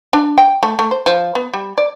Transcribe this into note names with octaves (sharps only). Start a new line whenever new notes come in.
D4
G5
A3
A3
C5
F3
B3
G3
D5